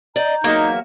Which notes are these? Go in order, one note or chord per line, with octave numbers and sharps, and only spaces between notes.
D5 D#5 A#5 G6
E2 F#3 A#3 D#4 E5